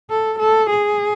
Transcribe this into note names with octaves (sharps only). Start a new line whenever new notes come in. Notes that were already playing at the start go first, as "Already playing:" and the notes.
A4
A4
G#4